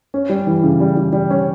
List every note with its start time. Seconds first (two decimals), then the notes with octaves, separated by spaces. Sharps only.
0.14 C#4
0.29 G3
0.47 E3
0.63 C#3
0.80 G3
0.97 G3
1.13 G3
1.30 C#4